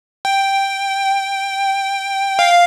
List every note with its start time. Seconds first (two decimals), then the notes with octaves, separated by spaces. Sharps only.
0.25 G5
2.39 F5